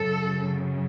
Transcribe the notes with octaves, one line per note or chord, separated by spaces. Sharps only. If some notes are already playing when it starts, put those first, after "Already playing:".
Already playing: F#2 C#3 A4